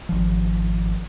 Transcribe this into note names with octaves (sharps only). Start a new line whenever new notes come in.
G#1 F3